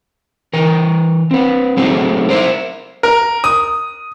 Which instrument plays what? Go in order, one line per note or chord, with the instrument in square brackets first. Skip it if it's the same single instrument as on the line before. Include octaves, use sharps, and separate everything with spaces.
[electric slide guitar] E3 A#4
C4 B4
F#3 A3 C4 D#4 G#4
A#4 C5 D5 E5
[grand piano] A#4
D#6